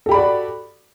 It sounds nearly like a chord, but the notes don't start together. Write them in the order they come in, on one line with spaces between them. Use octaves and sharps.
A4 G4 B5 D5 F#4